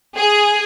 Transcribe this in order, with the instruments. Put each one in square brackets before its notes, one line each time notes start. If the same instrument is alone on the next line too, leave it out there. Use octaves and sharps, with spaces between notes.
[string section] G#4